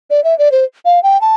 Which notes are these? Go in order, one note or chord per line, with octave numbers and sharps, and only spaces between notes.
D5
E5
D5
C5
F5
G5
A5